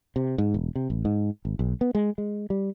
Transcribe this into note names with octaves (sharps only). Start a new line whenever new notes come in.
C3
G#2
E1
C3
A1
G#2
G#1
B1
B3
G#3
G#3
G3